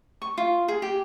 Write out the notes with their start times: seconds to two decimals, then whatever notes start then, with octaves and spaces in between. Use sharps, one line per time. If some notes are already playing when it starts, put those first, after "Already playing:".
0.22 C#6
0.38 F4
0.68 G#4
0.82 G4